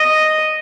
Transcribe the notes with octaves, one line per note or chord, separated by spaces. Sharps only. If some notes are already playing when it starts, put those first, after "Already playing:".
Already playing: D#5